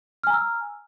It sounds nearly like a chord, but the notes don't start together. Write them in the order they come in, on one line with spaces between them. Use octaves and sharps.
F6 G#5 A#5 E6